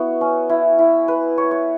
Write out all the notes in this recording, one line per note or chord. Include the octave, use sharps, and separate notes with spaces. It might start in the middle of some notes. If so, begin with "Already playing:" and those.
Already playing: B3 E4 F#4
C#4
E4
E4
B4
C#5
C#5